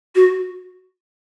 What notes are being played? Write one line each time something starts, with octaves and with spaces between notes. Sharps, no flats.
F#4